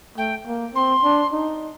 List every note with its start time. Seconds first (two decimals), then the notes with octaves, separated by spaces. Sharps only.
0.17 A3 G5
0.46 A#3
0.75 C4 C6
1.04 D4
1.32 D#4